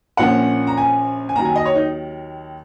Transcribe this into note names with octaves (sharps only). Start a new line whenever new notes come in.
A#1 A#2 F3 A#3 C#4 F#5
A#5
G#5
G#5
D#2 D#3 F#3 A#5
G#5
D#5
C#5
D#4